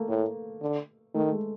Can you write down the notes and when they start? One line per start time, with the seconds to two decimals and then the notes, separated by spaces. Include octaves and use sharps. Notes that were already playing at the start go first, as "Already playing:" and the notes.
Already playing: A3 A#3
0.08 A2
0.61 D3
1.14 D#3 A3
1.32 G#3